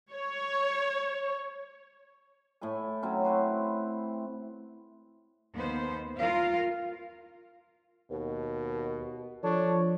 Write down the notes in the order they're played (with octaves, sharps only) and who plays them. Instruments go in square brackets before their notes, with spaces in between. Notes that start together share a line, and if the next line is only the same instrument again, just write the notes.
[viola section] C#5
[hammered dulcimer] A2 A3 E4 G#5
F#3 C4 C#4
C4 E4 B4 C5
[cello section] D#2 B3 C5
F4 A#4 F5
[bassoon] D#2 [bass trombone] B2
[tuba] F3 [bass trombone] D4 [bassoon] A4 [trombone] C#5